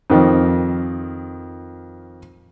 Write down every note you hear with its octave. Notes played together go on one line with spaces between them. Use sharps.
F2 D#3 F3